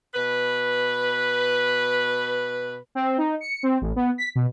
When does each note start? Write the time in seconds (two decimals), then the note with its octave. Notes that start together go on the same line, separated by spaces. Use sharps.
0.14 B2 B4
2.95 C4
3.18 D#4
3.41 C#7
3.63 C4
3.81 A1
3.96 B3
4.18 B6
4.35 B2